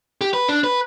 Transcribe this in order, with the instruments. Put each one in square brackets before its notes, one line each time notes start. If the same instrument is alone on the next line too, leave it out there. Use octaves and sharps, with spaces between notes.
[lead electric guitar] G4
B4
D4
B4